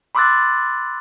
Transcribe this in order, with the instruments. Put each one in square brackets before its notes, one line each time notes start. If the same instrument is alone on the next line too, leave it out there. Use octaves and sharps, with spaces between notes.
[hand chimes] B5 C6 D6 E6 F#6 A6